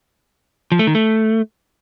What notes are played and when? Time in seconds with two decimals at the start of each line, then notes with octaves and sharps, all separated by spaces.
0.72 F3
0.79 A3
0.87 D#3
0.95 A3